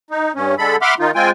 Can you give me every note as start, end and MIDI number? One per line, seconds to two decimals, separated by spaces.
0.11 0.32 63
0.35 0.55 43
0.35 0.55 61
0.58 0.76 50
0.58 0.76 56
0.58 0.76 69
0.58 0.76 83
0.82 0.94 76
0.82 0.94 78
0.82 0.94 83
0.82 0.94 84
0.82 0.94 86
0.82 0.94 89
0.99 1.11 51
0.99 1.11 63
0.99 1.11 65
1.15 1.31 56
1.15 1.31 60
1.15 1.31 65
1.15 1.31 79
1.15 1.31 80